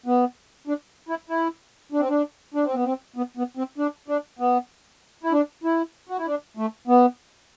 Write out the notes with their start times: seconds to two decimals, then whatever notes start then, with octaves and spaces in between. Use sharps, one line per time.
0.06 B3
0.67 D4
1.09 E4
1.29 E4
1.92 D4
2.00 C4
2.09 D4
2.54 D4
2.65 C4
2.74 B3
2.84 C4
3.16 B3
3.37 B3
3.57 C4
3.78 D4
4.08 D4
4.39 B3
5.23 E4
5.32 D4
5.64 E4
6.09 F#4
6.18 E4
6.26 D4
6.57 A3
6.87 B3